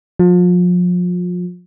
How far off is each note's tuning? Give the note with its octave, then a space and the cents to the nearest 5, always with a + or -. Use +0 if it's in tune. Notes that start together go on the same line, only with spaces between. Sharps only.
F3 +35